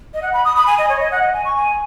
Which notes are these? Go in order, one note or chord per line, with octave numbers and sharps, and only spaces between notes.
D#5
F#5
B5
D#6
B5
G#5
D#5
C#5
D#5
F#5
D#5
G#5
C#6
G#5